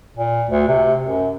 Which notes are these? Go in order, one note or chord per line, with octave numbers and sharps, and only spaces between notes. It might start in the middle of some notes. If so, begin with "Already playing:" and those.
A#2
D2
C3
F#2